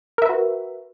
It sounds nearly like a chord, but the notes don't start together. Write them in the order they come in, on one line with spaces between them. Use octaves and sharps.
A#4 E5 B4 F#4